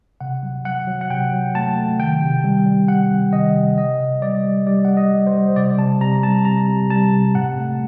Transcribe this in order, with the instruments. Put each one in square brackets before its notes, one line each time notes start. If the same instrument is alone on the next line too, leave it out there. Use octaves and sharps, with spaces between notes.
[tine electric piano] C3 F#5
F#3
F#3 F#5
F#3
F#5
C3 G5
F#3
A3 A5
A3
D#3 G5
C3
G3
G3
G3 F#5
C3
D#3 D#5
C3
C3 D#5
C3
G3 D5
G3
G3 D5
G3 F#5
D#5
G3
C5
G3
C3 D5
C3 A5
C3 A#5
G3 A5
C3 A#5
C3
G3 A5
C3
A2 F#5
A3